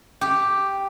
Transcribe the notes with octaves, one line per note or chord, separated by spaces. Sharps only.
G4